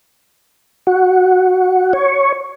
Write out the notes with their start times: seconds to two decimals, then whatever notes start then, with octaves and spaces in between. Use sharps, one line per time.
0.87 F#4
1.93 C#5